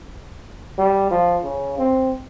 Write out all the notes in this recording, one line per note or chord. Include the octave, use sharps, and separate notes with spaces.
G3
F3
C#3
C4